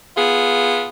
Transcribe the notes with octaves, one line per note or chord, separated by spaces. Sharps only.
B3 F4 G#4